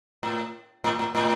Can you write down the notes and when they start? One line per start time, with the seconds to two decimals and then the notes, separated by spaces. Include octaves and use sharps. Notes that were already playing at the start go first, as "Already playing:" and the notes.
0.23 A2
0.84 A2
0.99 A2
1.15 A2